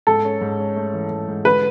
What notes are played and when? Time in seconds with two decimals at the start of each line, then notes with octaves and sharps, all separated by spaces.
0.07 G#2 A4
0.25 C#4
0.41 G#2
0.59 C#4
0.76 A3
0.93 E3
1.11 G#2
1.28 G#2
1.45 D3 B4